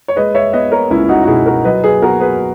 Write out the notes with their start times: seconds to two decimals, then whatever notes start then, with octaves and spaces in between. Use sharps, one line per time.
0.08 C#5
0.16 G#3 B4 D#5
0.35 C#5 E5
0.53 B3 B4 D#5
0.72 A#4 C#5
0.90 C#2 C#4 E4
1.09 D#4 F#4
1.24 F#4
1.27 B2 E4 G#4
1.46 F#4 A#4
1.65 F#3 B4 D#5
1.83 G#4 B4
2.02 B3 F#4 A#4
2.20 G#4 B4